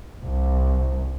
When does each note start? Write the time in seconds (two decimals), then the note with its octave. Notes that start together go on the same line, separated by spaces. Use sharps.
0.22 C2